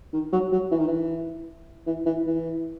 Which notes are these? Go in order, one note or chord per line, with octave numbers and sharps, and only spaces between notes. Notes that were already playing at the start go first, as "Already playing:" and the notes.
D#3
F#3
F#3
E3
D#3
E3
E3
E3
E3